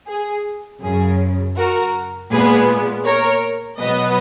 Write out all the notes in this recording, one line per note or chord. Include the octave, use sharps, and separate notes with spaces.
G#4
F#2 C#3 F#3 G#4
F#4 A#4
A#2 G#3 B3 G#4 B4
A#4 C#5
B2 F#3 B3 B4 D#5